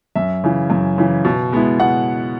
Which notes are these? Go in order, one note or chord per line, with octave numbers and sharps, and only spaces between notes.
F#2 E5
C#3 E3
F#2
C#3 E3
B2
G#3 B3 E4
B2 F#5